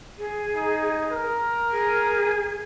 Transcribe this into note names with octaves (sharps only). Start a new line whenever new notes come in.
G#4
D#4
A#4
G#4